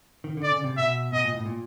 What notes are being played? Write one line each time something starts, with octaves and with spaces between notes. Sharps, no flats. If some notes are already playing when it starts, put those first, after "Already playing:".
D#3
D3
D5
C#3
C3
B2 E5
B2 D#5
A#2
A2
A#2